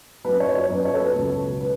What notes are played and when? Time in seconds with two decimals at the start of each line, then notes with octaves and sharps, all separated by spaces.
0.25 F#2 F#3 B4
0.40 C#5
0.55 C#5
0.70 F#2 F#3 B4
0.85 C#5
0.94 A4
1.00 B4
1.15 C#2 B2 F#3
1.61 B4